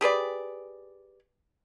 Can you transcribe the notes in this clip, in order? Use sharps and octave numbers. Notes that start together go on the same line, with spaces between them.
G4 G#4 B4 D5